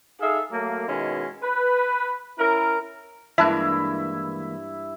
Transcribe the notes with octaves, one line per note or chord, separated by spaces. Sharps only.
D#4 G#4 A4 E5 F5
F#3 A3 A#3
B2 D#3 G#3 C#4 E4
B4
C#4 E4 A#4
G2 E3 G#3 A#3 E4 E5 A5 F#6